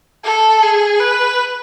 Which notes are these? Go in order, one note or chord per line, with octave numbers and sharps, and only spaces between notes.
A4
G#4
B4